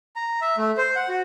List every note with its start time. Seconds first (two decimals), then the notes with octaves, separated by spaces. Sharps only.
0.16 A#5
0.41 E5
0.57 A3
0.77 C5
0.96 F#5
1.09 F#4